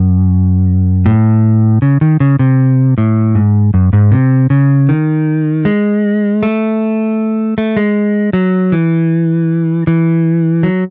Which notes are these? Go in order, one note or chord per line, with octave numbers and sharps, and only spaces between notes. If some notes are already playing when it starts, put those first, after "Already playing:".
Already playing: F#2
A2
C#3
D#3
C#3
C3
A2
G#2
F#2
G#2
C3
C#3
D#3
G#3
A3
A3
G#3
F#3
E3
E3
F#3